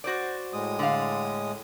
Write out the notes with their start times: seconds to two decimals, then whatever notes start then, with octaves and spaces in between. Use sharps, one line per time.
0.04 F#4 C5 D5
0.53 A2 G#3 D#6
0.79 D3 F5